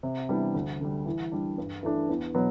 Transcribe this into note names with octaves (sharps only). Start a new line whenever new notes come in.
C3
E3 G3 B3 D4
D2
D3 G3
E3
G3 D4
G2
E3 A3 D4
E2
B2 F#3 B3